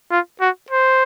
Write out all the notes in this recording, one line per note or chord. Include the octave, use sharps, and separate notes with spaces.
F4
F#4
C5